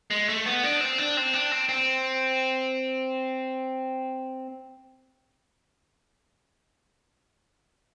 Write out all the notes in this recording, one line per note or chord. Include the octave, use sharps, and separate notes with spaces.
G#3
A3
B3
D4
C4
D4
C4
D4
C4
C4